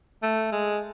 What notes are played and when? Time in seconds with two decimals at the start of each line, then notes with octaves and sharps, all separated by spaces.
0.23 A3
0.52 G#3